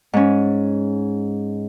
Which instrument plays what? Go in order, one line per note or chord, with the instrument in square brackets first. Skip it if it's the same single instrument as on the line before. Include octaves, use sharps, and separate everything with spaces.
[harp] G#2 C#4